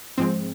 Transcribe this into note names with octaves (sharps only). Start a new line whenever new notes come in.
G#2 F3 G#3 C4